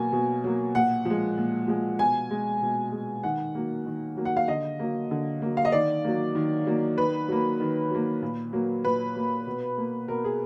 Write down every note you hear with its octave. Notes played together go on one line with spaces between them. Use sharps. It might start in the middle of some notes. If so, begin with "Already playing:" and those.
Already playing: B2 F#3 A#3 G#5
B2
F#3 A#3
A#2 F#5
F3
G#3
A#2
F3 G#3
B2 G#5
G#3
B2
G#3
D#3 F#5
F#3 A#3
D#3
F#3 A#3
F#5
F5
D3 D#5
F#3 A#3
D3
F#3 A#3
F5
D#5
D#3 D5
F#3 A#3
D#3
F#3 A#3
D#3 B4
F#3 A#3
D#3
F#3 A#3
A#2
F#3 A#3
A#2 B4
F#3 A#3
B2
A#3
B2 A#4
G#4